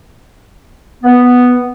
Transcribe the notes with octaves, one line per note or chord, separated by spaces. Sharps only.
B3